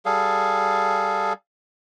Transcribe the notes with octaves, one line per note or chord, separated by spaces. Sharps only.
G3 G#4 A4 F5